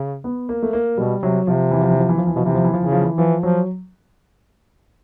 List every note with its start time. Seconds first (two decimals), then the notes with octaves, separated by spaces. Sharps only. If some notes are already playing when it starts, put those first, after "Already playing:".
Already playing: C#3
0.24 B3
0.49 A#3
0.63 A3
0.73 A#3
0.98 B2 G3
1.23 C3 F#3
1.47 C3 F3
1.71 E3
1.81 F3
1.90 E3
1.99 F3
2.09 E3
2.18 F3
2.27 E3
2.35 B2 F3
2.45 C3 E3
2.55 F3
2.64 E3
2.73 F3
2.82 C#3 E3
2.92 F3
3.02 E3
3.18 E3 F3
3.43 F3 F#3